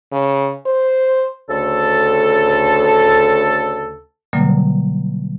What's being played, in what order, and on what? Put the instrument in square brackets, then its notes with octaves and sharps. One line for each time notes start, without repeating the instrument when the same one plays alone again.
[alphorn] C#3
C5
[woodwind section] D2 C#3 A4
[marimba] B2 D3 F#3 G3 A#3